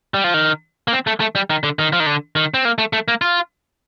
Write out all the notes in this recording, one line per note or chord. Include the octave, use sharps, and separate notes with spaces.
G3
F3
D#3
A#3
C4
A3
A3
G3
D#3
D3
D#3
F3
D#3
D3
D#3
C4
A#3
A3
A3
A#3
F4